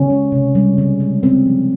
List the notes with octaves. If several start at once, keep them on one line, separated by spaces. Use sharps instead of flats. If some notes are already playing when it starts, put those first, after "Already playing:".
Already playing: C#3 C#4
G#3
C3
G3
C#3
G#3
C4
F3